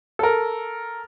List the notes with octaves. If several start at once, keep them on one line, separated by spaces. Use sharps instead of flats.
A4 A#4